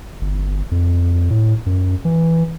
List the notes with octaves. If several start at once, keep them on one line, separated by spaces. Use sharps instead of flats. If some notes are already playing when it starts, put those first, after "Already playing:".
G1
F2
A2
F#2
E3